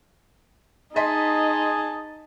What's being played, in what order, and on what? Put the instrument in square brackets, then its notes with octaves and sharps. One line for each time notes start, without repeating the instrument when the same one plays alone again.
[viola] D#4 [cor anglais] G#4 [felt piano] D#5 C6 B6 [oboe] A5